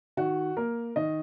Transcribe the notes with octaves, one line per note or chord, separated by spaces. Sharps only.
D#3 F#4
A#3 A#4
D#3 D#5